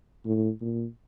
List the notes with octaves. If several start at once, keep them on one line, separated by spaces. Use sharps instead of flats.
A2
A#2